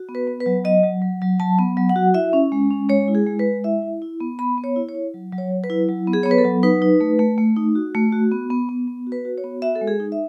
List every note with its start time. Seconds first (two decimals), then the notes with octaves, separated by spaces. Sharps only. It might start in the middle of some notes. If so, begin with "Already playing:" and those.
Already playing: F#4
0.09 B3
0.15 B4
0.27 B3
0.40 B4
0.46 F#3
0.65 F#3 D#5
0.84 F#3
1.02 F#3
1.22 F#3
1.39 F#3 A5
1.59 B3
1.77 F#3
1.89 F#5
1.96 F#4
2.14 E4 E5
2.33 C#4
2.52 G#3
2.71 C#4
2.89 G#3 C#5
3.08 E4
3.15 G#4
3.27 G#3
3.39 B4
3.45 G#3
3.64 E4 E5
3.82 E4
4.02 E4
4.20 B3
4.39 B3 B5
4.58 B3
4.64 C#5
4.76 E4
4.89 C#5
4.95 E4
5.14 F#3
5.32 F#3
5.38 C#5
5.51 F#3
5.64 B4
5.70 E4
5.89 F#3
6.07 B3
6.13 G#4
6.23 B3 C#5
6.31 B4
6.38 A4
6.44 F#3
6.63 D#4 B4
6.82 D#4
7.01 A3
7.19 A3
7.38 A3
7.56 D#4
7.75 F#4
7.95 A3
8.12 F#4
8.31 B3
8.50 B3
8.69 B3
8.88 B3
9.07 F#4
9.12 B4
9.25 F#4
9.38 C#5
9.44 B3
9.62 F#4 E5
9.76 A4
9.81 G#3
9.87 G#4
10.00 D#4
10.12 E5